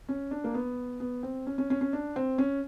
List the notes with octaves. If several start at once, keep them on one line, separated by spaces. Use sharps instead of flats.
C#4
D4
A#3
B3
B3
C4
C#4
C#4
C#4
C#4
D4
C4
C#4